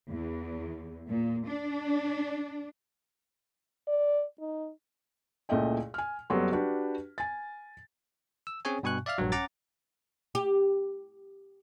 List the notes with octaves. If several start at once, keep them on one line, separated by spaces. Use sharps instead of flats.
E2
A#2
D4
D5
D#4
C#2 A#2 A3 E4 D#5 G5
G#5 F6
F#1 F#3 G3 B3 A4 C6
D4 F#4 G4 B4
G#5 A6
E6
C4 C#4 G#4 C#5 G#5
G2 B2 G#5 C#6 F#6
D5 E5 F5 F6
A#1 G2 F#3
C#4 F#5 A#5 D6 A6
G4